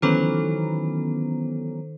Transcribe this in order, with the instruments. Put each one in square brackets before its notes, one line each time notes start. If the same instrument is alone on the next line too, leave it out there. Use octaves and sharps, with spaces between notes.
[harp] D#3 [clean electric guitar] E3 F#3 [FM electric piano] B3 C#4 A#5 [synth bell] A4 C5